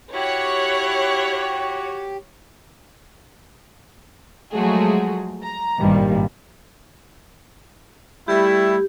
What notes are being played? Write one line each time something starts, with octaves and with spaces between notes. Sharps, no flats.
E4 F#4 G4 C#5 F#6
F3 F#3 G#3 A3 F#4 G#4
A#5
G#1 G2 A#2 D#3 G3
G3 A3 E4 G4